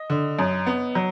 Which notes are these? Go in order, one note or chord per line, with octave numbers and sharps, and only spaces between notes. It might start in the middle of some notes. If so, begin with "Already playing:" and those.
Already playing: D#5
D3
F#2
B3
F#3